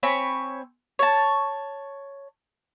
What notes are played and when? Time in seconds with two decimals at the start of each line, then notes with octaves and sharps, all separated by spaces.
0.03 C4 C#5 G#5 B5
0.99 C#5 A5